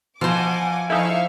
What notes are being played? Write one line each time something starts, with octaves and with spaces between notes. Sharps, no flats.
B2 F3 C5 F#5 G#5 D6
F3 D#4 E4 A4 E5 F5 G#5 C#6